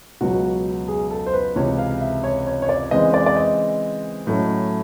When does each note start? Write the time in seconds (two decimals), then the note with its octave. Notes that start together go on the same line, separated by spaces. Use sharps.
0.21 C#2 B2 F#3 F#4
0.88 G#4
1.11 A4
1.26 C5
1.33 B4
1.56 C#2 C3 E3 C#5
1.79 F5
2.01 E5
2.24 C#5
2.46 C#5
2.62 C#5
2.69 D5
2.91 C#3 E3 G#3 C4 D#5
3.14 D5
3.26 D5
3.36 D#5
4.27 A2 F#3 A3 C#4